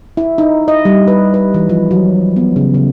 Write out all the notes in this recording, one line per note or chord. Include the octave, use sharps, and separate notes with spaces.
E4
D#4
D#5
G3
B4
B4
E3
F3
F#3
B3
C#3
C#3